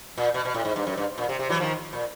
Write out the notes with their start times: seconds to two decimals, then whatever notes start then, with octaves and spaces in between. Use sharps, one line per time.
0.18 A#2
0.34 B2
0.45 B2
0.54 A2
0.65 G#2
0.76 G2
0.87 F#2
0.97 G2
1.18 A#2
1.29 C3
1.39 C3
1.49 E3 F#3
1.60 D#3 F3
1.93 A#2